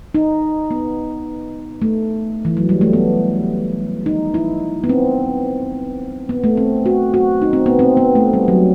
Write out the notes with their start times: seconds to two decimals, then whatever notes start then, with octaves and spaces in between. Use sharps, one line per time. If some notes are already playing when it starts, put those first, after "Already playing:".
0.15 D#4
0.71 B3
1.82 A3
2.45 E3
2.57 F#3
2.69 G3
2.81 A3
2.93 B3
4.06 D#4
4.34 E4
4.84 B3
4.89 C4
6.29 B3
6.44 A3
6.57 C4
6.86 F#4
7.14 F#4
7.42 D#4
7.53 C4
7.66 B3
7.79 C4
7.97 B3
8.15 A3
8.34 G3
8.48 F#3